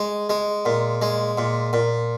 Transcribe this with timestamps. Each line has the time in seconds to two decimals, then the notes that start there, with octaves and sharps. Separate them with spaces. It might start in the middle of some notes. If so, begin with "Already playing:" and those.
Already playing: G#3
0.29 G#3
0.65 A#2
1.02 G#3
1.38 A#2
1.73 A#2